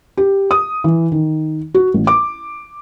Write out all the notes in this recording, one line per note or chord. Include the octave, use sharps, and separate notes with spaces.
G4
D#6
E3
D#3
F#4
A1
D6